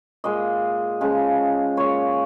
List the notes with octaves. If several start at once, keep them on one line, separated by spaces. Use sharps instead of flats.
A#2 G#3 D#5
C#3 F3 G#3
A#2 G#3 C#5